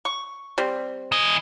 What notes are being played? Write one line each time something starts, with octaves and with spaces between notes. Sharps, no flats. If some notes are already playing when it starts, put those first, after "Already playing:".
C#6
G3 C4
E3 D#5